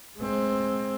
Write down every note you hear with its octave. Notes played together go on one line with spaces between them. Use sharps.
G#3 C4